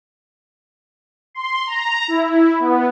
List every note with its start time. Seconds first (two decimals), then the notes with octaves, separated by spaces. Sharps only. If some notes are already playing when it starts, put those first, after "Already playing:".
1.35 C6
1.67 A#5
2.08 E4
2.60 B3